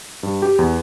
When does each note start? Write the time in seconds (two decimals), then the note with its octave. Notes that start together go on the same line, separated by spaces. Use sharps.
0.23 G2
0.42 G4
0.59 E2